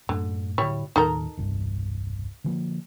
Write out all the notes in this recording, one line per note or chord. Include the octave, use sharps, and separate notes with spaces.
F#2 A2 D3
A2 D3 G3 E4 C#5
D#2 A2 D#3 D#4 A4 A#4
E1 C2 G2
D3 F3 A#3